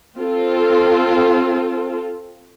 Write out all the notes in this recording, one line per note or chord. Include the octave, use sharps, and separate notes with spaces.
C4 F4 A4